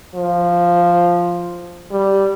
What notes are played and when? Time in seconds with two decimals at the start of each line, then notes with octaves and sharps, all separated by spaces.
0.15 F3
1.91 G3